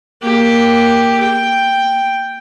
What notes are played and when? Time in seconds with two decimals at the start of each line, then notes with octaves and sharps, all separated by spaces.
0.22 A#3 G4
1.21 G5